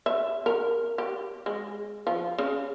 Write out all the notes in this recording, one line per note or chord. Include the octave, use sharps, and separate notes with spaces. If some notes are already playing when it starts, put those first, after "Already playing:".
E5
A#4
G4
G#3
F3
C#3